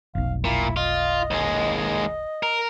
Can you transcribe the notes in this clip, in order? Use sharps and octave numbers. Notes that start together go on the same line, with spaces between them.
F1 B1 F5
A#2 E4
F4 D#5
D#2 G#3
A#4